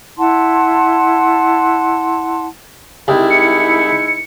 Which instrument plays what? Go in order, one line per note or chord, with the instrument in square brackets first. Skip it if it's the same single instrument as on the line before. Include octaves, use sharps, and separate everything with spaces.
[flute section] E4 F#5 A5 C6
[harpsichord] C2 [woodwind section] G#3 D#4 E4
[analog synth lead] C#7